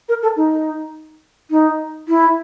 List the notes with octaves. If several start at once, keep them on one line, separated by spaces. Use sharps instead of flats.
A#4
A4
D#4
D#4
E4